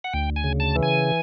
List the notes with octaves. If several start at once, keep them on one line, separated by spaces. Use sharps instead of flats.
F#5
D2 G5
G#5
C#3
A5
E3
G#5